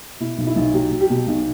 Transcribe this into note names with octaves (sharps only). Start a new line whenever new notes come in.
B2 E4
B1
E4
B1
F#3 G4
F#3
G4
B2
B1